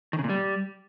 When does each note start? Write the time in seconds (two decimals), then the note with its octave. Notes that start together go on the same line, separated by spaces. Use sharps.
0.13 D#3
0.19 C#3
0.24 A#2
0.29 G3